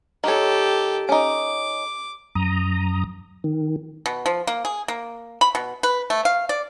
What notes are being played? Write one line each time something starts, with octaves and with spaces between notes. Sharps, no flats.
D#3 G4 A4 C#5
C#4 D#4 D6
F#2 A#5 D#6
D#3
B2
F3
A#3
G#4
A#3
B5
B2
B4
A3
F5
D5